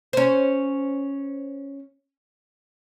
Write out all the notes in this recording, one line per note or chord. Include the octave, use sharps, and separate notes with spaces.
C#4 C5